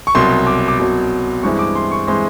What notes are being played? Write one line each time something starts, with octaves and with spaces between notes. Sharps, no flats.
C#6
C2 B2 F#3 C6
D6
D6
C2 B2 F#3
G2 E3 G#3 C4 E4 C#6
D6
C6
C#6
E3 G#3 C4 E4 C6